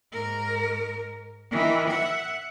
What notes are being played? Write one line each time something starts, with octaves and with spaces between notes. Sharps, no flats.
G#2 A#4
D#3 E3
E5 F#5